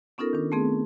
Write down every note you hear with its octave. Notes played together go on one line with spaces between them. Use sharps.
B3 C#4 D#4 F4 A4 A#4
D#3 D4
A3 B3 C4 G#4